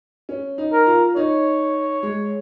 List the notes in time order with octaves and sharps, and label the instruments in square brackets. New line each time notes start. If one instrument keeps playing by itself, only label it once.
[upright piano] C#4
D#4
[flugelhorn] A#4
[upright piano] F4
[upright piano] D#4 [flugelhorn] C#5
[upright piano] G#3